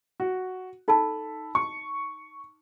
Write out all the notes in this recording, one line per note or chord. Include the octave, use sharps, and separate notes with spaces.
F#4
D#4 A4 A5 B5
C#6